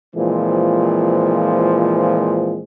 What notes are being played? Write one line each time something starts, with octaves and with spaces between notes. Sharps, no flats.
A#2 E3 F3 G#3 C4